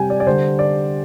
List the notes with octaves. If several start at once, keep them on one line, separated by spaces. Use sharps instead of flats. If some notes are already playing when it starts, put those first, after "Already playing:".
Already playing: C3 G3 G5 G#5
D5
D5
D3 G3 C5
D5